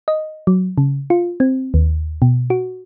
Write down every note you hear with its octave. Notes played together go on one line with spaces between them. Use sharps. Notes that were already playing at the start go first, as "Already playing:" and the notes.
D#5
F#3
C#3
F4
C4
D#2
B2
F#4